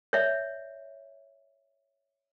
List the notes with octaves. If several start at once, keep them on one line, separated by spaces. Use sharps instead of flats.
C#5 D5 E5